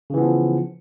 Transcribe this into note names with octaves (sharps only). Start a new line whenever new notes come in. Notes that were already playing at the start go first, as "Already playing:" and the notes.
C#3 E3 F3 B3